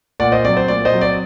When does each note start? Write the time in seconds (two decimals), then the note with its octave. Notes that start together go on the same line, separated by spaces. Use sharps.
0.20 A#2 D5 F#5
0.32 C5 D#5
0.44 F#3 C4 D5
0.57 C5
0.68 A#2 D5
0.85 C5 D#5
0.93 F#3 C4
1.01 D5